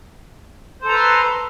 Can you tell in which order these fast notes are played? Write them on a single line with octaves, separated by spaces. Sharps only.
C5 A4 A#5 B4 C6